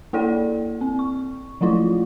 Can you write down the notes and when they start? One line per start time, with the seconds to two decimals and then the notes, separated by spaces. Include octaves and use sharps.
0.13 A#3 E4 A4 D5 G5
0.81 C4
0.99 C#6
1.61 F3 F#3 A3 E4 F4